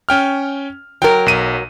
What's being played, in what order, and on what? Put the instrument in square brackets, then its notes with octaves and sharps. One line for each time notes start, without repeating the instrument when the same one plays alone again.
[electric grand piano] C#4 G5 F6
[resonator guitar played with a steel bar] F#3 A#4 [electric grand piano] G5
[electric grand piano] B1 D#7